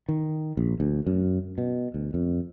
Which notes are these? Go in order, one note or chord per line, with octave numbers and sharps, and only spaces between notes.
D#3
A#1
D2
F#2
B2
D2
F2